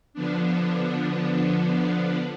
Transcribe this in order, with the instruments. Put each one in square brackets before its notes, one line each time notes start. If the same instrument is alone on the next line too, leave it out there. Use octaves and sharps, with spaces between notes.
[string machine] D3 F3 B3 D4